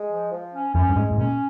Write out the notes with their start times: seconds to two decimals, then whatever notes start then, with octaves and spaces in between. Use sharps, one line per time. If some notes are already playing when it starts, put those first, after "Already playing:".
Already playing: G#3
0.09 F3
0.32 F3
0.52 C#4
0.74 F2 C#4
0.89 G2
0.96 G#2 G#3
1.11 G#2
1.18 A#2 C#4